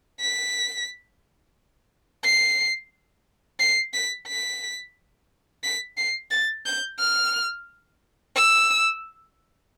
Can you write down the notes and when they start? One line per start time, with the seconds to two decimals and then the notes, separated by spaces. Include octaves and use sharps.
0.21 B6
2.24 C7
3.60 C7
3.93 B6
4.28 B6
5.64 B6
5.97 C7
6.31 A6
6.66 G6
6.99 F6
8.36 E6